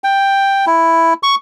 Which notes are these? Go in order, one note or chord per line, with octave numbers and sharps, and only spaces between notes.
G5
E4
C#6